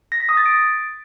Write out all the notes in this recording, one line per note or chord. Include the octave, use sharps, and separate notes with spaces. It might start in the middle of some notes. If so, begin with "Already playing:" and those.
A#6
B6
D#6
A6
D7